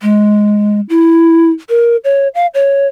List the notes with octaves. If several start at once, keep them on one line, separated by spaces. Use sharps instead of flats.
G#3
E4
A#4
C#5
F5
C#5